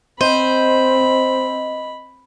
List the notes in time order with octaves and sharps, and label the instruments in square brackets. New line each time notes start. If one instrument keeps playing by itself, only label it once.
[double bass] C4 [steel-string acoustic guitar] C5 [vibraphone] D#5 [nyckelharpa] B5